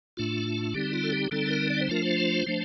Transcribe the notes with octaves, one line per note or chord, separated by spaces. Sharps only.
A2 A3 D4 F4
D3 G3 C4 D#4 G4
F4
A4
G4
D3 G3 C4 D#4 A4
A#4
D5
C5
F3 A3 D4 F4 A#4
C5
F3 A3 D4